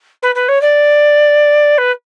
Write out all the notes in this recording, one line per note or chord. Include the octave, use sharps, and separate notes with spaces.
B4
B4
C#5
D5
B4